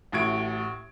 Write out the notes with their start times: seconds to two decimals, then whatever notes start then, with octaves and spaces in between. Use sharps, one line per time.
0.12 A1 A2 F#4 G#6 D7